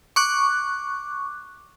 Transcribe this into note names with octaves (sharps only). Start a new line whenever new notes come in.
C#6 D6 F#6